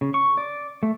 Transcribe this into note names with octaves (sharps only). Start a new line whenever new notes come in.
C#3
C#6
D5
A3